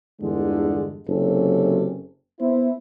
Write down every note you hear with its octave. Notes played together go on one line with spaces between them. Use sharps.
G1 E2 G2 D3 G#3
F#1 F#2 C3 C4 C#4 A4
B3 E4 C5